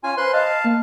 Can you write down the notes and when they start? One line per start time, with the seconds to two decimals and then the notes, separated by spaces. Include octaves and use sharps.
0.04 C#4 F4 F5 G#5
0.17 B4 C5 C6 F#6
0.33 D#5 F5 A5
0.64 A#3